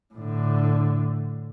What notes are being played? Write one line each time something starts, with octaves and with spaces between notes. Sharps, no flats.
A2 D3